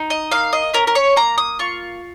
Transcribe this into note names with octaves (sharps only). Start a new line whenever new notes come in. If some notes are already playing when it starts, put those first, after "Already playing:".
Already playing: D#4
D#5
A#3 F5
D#5
C#4 A#4
A#4
C#5
A#3 A#5
D#6
F4 C#6